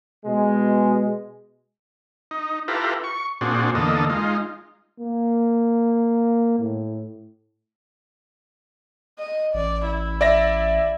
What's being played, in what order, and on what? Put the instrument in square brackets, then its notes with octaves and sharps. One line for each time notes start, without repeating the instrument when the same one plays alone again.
[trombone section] B2 G#3
[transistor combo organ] D#4
E4 F4 G4 A4 B4 A#5
C#6
A#2 C4 D4 F#4 G#4
E2 D3 A#3 A4 D#5
G#3 D#4 F4
[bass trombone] A#3
A2
[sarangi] D#5
[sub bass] A1 [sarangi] D5
[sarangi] E4
[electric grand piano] D5 E5 A#6